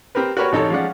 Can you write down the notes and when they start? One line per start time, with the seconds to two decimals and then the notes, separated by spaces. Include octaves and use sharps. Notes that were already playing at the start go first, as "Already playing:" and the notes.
0.15 C4 G4 A#4 B4
0.37 F#4 G4 A#4 B4 C#5
0.52 A1 C3 D#4 A4 C#5 A5
0.70 F3 G#3 C#4 D5 F#5